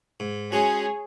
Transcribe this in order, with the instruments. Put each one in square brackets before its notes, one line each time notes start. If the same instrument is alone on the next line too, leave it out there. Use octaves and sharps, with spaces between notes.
[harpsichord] G#2
[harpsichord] G#3 C#4 F#4 [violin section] G#4 C#5